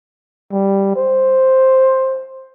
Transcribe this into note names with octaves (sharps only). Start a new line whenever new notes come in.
G3
C5